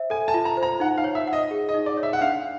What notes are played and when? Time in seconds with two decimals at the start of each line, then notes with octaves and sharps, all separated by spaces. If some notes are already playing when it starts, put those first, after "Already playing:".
Already playing: C5 E5
0.10 A4 G#5
0.28 A5
0.34 F4
0.45 A#5
0.57 C5
0.63 A#5
0.80 D#4 F#5
0.98 F5
1.04 C#5
1.15 E5
1.28 F#5
1.33 D#5
1.51 G#4
1.69 D#5
1.74 D#4
1.86 D5
1.97 C#5
2.03 E5
2.13 F#5
2.21 D4 F5